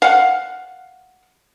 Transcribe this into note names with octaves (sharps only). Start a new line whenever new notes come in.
F5 F#5